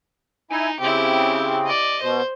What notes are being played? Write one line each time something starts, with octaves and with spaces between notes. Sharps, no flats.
D#4 E4 G#5
C#3 C4 E4 G4
D5 D#5
B2 C5